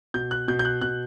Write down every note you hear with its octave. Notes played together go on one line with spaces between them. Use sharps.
B2 G6
F#6
B2 G6
G6
F#6
B2 F#6